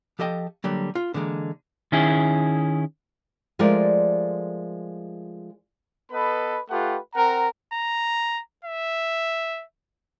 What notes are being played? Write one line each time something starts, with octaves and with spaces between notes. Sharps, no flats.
F3 G4 A4 D#5 G5
D3 F#3 G3 A#3
F4
D3 E3 G#3 A#3
D#3 C#4 E4 G#4
F3 G#3 A3 F4 A#4 D5
B3 A4 B4 D#5 B5
A3 F4 G4 B4 F#5
C4 A#4 F#5 A#5
A#5
E5